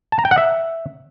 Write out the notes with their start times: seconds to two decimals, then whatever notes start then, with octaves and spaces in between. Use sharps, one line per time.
0.12 A5
0.19 A#5
0.25 G5
0.31 F#5
0.38 E5